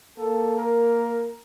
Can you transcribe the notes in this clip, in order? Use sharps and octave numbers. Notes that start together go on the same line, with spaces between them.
A#3 A4
A#4